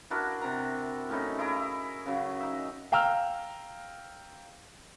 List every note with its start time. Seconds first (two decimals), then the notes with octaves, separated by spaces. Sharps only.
0.10 D4 E4 F#4 A#4
0.41 C3 A#5
1.09 A2 C#4 D#4 E4
1.39 E4 G#4 A#5
2.06 C#3 F#3
2.40 D#4 E5
2.92 F5 G5 A#5 E6 F6